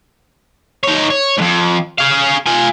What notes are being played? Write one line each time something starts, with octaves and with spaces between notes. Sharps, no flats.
D#4 C#5
C#5
F2 G#2
G#4 F5
F4 G#5